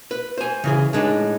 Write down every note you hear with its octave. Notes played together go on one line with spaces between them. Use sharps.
B4
C5 G#5
C#3 E3 G#4
A2 G#3 D4 D#4